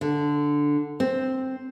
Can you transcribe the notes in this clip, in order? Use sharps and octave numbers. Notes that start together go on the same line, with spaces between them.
D3
C4